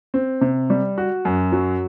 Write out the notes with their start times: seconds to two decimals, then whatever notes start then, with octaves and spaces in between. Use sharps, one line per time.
0.14 C4
0.41 C3
0.70 G3
0.98 F#4
1.25 F#2
1.52 F#3